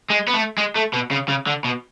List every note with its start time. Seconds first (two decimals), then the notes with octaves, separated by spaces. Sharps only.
0.10 G#3
0.28 B3
0.34 A3
0.58 G#3
0.76 A3
0.93 B2
1.11 C#3
1.28 C#3
1.47 D3
1.64 B2